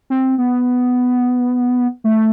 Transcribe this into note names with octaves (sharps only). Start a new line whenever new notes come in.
C4
B3
A3